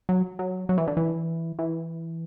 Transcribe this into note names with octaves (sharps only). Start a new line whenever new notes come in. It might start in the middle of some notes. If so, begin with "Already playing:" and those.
F#3
F#3
F#3
E3
D3
E3
E3